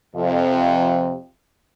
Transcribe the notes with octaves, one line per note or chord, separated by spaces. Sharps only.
F2 C3 F3